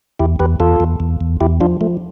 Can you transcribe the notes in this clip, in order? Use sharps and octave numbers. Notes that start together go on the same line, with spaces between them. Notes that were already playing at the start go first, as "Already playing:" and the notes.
E2 E4 G4
E2 G4 B4
E2 F4 A4
E2
E2
E2
E2 E4 G4
F3 D4 F4
F3 A3